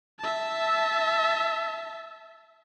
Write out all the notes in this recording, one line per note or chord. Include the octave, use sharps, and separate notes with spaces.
E5 A5